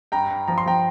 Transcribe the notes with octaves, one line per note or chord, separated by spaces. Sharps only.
G2 G5 A#5
G2
F3 A#5
C6
F3 G5 A#5